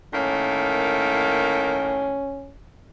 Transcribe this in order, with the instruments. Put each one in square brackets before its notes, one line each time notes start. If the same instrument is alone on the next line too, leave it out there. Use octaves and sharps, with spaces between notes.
[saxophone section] A2 D#3 A#3 [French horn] C#4